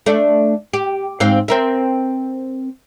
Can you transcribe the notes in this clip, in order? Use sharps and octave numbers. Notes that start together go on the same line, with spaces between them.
A3 D4
G4
G#2 C4 F5
C4 A#4 E5